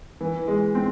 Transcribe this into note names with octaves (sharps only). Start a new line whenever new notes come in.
E3
G#3
C4